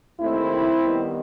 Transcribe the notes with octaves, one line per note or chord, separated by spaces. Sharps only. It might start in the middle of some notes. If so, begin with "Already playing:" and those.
D#2 D#3 A3 C4 E4
D#2 D#3 G3 B3